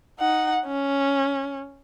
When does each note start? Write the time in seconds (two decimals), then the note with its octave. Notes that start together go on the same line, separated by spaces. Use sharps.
0.20 D#4 F#5
0.66 C#4